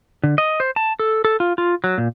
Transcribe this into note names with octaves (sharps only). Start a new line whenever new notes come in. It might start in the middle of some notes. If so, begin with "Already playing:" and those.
D3
D#5
C5
A5
A4
A4
F4
F4
F#3
A#2